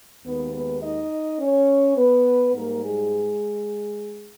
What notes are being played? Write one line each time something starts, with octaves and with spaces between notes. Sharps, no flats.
D#2 D#3 G#3 B3 B4
B3 B4
D#4 D#5
C#4 C#5
B3 B4
G#2 G3 A#3 A#4
G#3 G#4